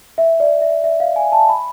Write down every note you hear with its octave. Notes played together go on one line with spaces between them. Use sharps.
E5
D5
E5
E5
F5
G#5
A5
B5